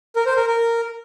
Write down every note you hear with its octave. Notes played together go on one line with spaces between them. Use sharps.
A#4
C5
A#4
A#4